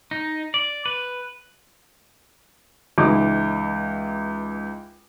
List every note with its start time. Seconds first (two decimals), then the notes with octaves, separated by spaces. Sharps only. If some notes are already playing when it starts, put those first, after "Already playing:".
0.11 D#4
0.54 D5
0.86 B4
2.98 C#2 E3 D#4 D6